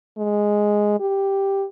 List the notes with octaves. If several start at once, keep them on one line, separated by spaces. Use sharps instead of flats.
G#3
G4